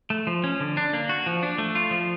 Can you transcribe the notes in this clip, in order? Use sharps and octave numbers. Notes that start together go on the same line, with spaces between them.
A3
F3
C#4
D3
D4
A#3
F#4
F3
D4
A3
F4
F3